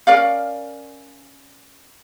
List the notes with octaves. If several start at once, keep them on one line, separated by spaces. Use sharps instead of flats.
C#4 A#4 D5 F5